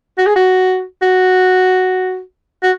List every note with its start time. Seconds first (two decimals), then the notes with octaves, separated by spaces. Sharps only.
0.18 F#4
0.26 G#4
0.36 F#4
1.02 F#4
2.63 F#4